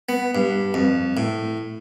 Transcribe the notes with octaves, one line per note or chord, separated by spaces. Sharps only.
B3
G2
F2
A2